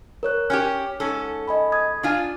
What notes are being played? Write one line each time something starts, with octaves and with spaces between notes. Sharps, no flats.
A#4 C#5 F#6
C#4 F#4 G4 C#5 F6
G#2 C#4 A4
D#5 G#5 B5
D#6 G#6
D4 F4 G#5